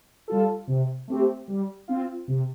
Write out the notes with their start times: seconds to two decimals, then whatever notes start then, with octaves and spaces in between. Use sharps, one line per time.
0.28 G3 F4 A4
0.67 C3
1.08 A3 C4 G4
1.48 G3
1.88 C4 F4
2.28 C3